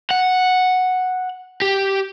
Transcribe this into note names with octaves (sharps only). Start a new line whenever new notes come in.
F#5
G4